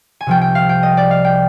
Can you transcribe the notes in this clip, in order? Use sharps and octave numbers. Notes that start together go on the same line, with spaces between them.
G#5
C2 C3 F3 G5
G5
F5
G5
D#5
D5
F5
G5